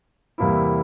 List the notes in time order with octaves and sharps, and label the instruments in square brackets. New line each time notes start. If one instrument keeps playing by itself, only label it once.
[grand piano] E2 C3 G3 A#3 E4